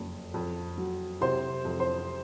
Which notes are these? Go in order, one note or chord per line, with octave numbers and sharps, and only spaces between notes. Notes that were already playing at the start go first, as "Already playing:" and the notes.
Already playing: F#1 F2
F2
F#3
C3 C5 C6
F2
C5 C6